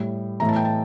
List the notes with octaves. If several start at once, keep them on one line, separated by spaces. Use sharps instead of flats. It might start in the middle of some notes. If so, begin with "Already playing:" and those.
Already playing: A2 G3
A2 E3 A3 A#5
A5
G5
A5